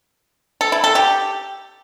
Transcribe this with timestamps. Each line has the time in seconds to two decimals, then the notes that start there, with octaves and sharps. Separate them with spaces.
0.61 A4
0.72 E4
0.84 A4
0.95 G4